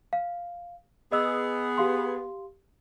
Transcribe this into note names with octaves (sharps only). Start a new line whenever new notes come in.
F5
B3 G#4 D#5 E6
G4 F5 C6